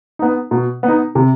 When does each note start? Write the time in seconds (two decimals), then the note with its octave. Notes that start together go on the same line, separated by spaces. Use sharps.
0.19 B3 D#4
0.51 B2
0.83 B3
0.88 D#4
1.15 C3